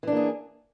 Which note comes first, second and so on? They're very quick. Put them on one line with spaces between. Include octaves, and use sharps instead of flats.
E3 D4 A#3 G#4